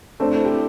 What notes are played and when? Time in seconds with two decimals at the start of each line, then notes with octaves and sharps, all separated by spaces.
0.20 A3 C4 D4 A4 C5
0.33 E4
0.45 G4